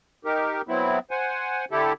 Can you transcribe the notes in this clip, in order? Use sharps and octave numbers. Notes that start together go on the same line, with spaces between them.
D#4 G4 A#4
F#3 B3 C4 E4
C5 F#5 G#5
D3 E4 G4 A4